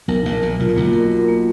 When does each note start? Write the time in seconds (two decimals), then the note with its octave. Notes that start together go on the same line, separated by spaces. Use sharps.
0.08 B1 B2 A#4
0.25 A#1 A#2 A#4
0.42 A#1 A#2 A#4
0.60 B1 B2 F4
0.68 A#2
0.76 B1 B2 A#3
0.93 A#4
1.11 A#4
1.28 A#3